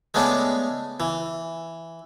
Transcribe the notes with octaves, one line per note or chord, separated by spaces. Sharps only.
G#3 A3 B3 C#4 D4
E3